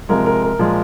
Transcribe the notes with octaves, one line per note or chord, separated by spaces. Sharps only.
C3 F3 G#3 A#4
A#4
A#4
A#2 F3 G#3